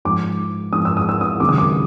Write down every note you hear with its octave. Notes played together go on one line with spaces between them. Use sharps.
G#2 F3 D6
G#2 F3 D#6
E6
D#6
E6
D#6
C#2 C3 D#3 F#3 D6
D#6
D6